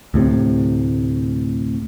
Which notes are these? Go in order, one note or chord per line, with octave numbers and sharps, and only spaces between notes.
D2 A2 C3